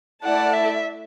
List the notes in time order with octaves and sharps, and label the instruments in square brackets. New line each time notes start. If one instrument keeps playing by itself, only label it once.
[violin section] A3 E4 D5 A5 [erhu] F#5
[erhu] E5